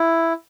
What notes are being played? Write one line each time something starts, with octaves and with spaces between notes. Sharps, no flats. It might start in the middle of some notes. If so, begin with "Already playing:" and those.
Already playing: E4